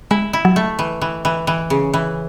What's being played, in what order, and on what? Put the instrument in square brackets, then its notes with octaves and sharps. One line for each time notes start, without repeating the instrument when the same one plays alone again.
[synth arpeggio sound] G#3 [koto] E4
[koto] E4
[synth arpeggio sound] F#3
[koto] A3
E3
E3
E3
E3
C#3
E3